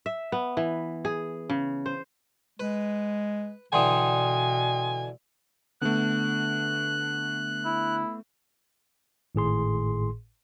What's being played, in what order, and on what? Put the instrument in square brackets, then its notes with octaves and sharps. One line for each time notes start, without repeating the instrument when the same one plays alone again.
[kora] E5
B3
E3
G#4
C#3
C5
[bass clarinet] G#3 [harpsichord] B4
[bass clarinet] B2 [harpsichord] D3 E3 [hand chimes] G5 C6 D#6 [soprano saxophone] G#5
[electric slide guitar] D3 [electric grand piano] A3 B3 [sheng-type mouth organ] F#6
[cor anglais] E4
[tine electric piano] G#1 A2 G#4 C6